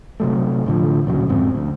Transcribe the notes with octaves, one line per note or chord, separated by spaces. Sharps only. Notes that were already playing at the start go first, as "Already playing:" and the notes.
C3 F#3 A3
A2 D3 F3
D2 A#2 C#3 F#3
F2 G#2 C4
D2